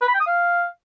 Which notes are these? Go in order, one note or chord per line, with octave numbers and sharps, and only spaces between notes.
B4
B5
G5
D#6
F5